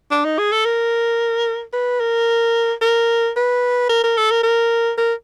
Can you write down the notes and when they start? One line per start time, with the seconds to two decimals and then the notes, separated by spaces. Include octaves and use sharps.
0.11 D4
0.25 D#4
0.38 G#4
0.52 A4
0.65 A#4
1.73 B4
2.00 A#4
2.81 A#4
3.36 B4
3.89 A#4
4.04 A#4
4.17 A4
4.31 A#4
4.43 A#4
4.98 A#4